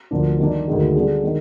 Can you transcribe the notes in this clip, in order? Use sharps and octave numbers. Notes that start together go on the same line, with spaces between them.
D2 D3 F3 A#3 D4
D#3 G3 A#3 D4
D2 C3 D#3 G#3
D3 G3 D4 G#4
D#3 G#3